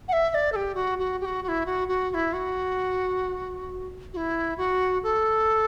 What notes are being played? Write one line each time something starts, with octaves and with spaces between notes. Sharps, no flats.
F#5
E5
E5
D5
A4
G4
F#4
F#4
G4
F#4
F#4
E4
F#4
F#4
F#4
E4
F#4
F#4
E4
F#4
A4